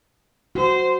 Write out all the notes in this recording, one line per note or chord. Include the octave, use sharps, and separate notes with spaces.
F#4 C5